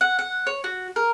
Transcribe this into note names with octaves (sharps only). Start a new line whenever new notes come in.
F#5
F#5
C#5
F#4
A#4